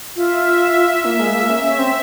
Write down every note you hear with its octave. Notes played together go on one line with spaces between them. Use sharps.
F4 E5
F4
F4
A#3
G#3
A#3
C#4
C#4
C4